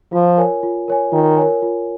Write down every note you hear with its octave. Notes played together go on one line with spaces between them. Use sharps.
F3 F4
A#4 C#5 G#5
F4
A#4 C#5 G#5
D#3 F4
A#4 C#5 G#5
F4